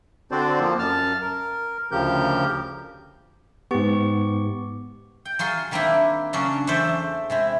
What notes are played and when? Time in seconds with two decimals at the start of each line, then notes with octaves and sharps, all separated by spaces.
0.31 D3 C4 D4 F#4 C5 D5
0.59 F3 A#3
0.79 F#2 A5 F6
1.21 A#4
1.91 D2 C#3 F3 G4 A#4 G6
3.71 G#2 B3 G4 C#6
5.25 G5
5.39 F#3 F4 G#4 C6
5.71 D#3 G3 A#3 C4 D4 E4
6.33 C#3 F#3 C#4 D4 D5
6.67 E2 A3 A4 C5 D5 E5
7.30 C3 G#3 E4